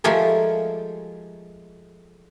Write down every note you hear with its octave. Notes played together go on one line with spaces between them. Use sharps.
F3 G#3 A3 G4 G#4 A#4